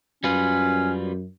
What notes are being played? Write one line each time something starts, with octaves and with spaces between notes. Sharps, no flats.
F#2 G3 C#4 F4 B4